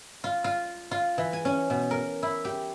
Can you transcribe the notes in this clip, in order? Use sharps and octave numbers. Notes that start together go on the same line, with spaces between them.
F4
F4
F4
E3
G#5
C#4
B2
A#4
E4
G4